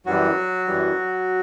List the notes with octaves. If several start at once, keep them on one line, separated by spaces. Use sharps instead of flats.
F#2 E3 F#3 G3 F#4
F#2 E3 G3